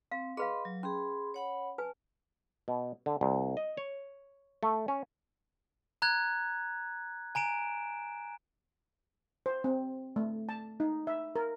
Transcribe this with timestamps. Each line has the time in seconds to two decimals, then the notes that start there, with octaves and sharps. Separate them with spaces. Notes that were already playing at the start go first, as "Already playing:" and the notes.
0.12 C4 F5
0.37 G#4 B4 D#5 F5 B5 C6
0.65 F#3
0.83 C#4 G#4 B5 C6
1.34 C#5 F#5 B5
1.78 B4 G#5 A5
2.68 B2
3.06 D3
3.21 C2
3.57 D#5
3.77 C#5
4.63 A3
4.88 C#4
6.02 A#5 F#6 G#6
7.35 G#5 A#5 D7 E7
9.46 C5
9.64 C4
10.16 A3
10.49 A5
10.80 D#4
11.07 E5
11.36 A#4